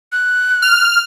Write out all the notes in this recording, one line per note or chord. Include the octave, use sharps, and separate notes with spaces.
F#6
F6